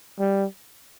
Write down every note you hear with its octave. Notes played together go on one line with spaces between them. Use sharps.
G3